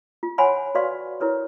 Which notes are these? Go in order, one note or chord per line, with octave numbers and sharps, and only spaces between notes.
F4
C5 C#5 F#5 G#5 B5 C6
F#4 B4 D5 F5 C6 C#6
E4 A#4 B4 C#5